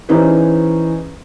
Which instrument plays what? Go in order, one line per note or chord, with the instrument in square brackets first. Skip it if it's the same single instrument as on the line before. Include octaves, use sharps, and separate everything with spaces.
[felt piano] E3 C#4 D#4 G#4 B4 C5